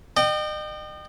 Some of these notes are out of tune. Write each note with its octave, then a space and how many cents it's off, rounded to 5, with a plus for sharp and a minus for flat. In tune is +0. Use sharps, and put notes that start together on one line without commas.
D#5 -40 G5 -10